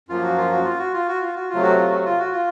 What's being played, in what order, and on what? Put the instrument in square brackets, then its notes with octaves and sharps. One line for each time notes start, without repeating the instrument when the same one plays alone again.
[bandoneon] F#2 F3 A#3 F4
F#4
F4
F#4
F4
F#4
F4
F#4
F4
F#4
F4
C3 F#3 A3
F#4
F4
F#4
F4
F#4
F4